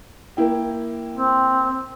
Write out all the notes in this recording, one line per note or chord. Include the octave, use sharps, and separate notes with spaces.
A#3 E4 G5
C4